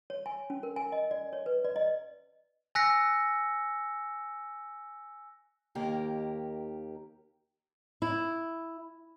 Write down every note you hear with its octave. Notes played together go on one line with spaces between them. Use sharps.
C#5
G#5
C#4
A#4
G#5
D#5
D5
C#5
B4
D5
D#5
G#5 E6 F#6 A#6 B6 C#7
D#2 D#3 A#3 G4 A#4
E4